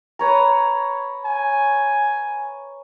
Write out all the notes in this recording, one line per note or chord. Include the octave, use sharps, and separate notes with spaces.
B4 C#5 A#5
G#5